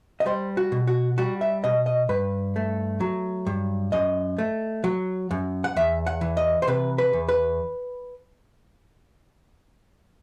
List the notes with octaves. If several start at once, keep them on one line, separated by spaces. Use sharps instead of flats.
D#5
G3 C5
F#4
B2
F#4
G3 F#4
E5
B2 D#5
D#5
G2 B4
A3
F#3
G2
F#2 D#5
A3
F#3
F#2
F#5
E2 E5
F#5
E3
D#5
C5
C3 B4
B4
E2
B4